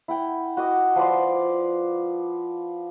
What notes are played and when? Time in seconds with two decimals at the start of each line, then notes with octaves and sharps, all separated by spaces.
0.08 E4 F#5 G5
0.57 F#4 D#5 D6
0.96 F3 B4 D5 C6